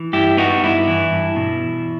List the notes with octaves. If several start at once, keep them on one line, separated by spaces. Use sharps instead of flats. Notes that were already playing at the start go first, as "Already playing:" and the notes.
Already playing: E3
G2 E4 G4
B3 D#4 F#4
G2 E4
E3
G2
B2
E2